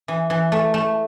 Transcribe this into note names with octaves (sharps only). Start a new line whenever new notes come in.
E3
E3
A3
A3